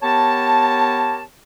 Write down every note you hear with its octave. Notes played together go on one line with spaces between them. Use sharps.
B3 G4 A#4 C#5 A5